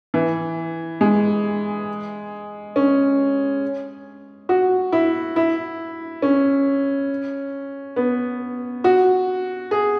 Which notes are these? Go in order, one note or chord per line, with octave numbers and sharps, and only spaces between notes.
E3
G#3
C#4
F#4
E4
E4
C#4
B3
F#4
G#4